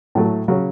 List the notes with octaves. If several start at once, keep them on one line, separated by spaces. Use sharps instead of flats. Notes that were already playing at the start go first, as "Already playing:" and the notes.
A2 F#3 A3
C#3 F#3 C#4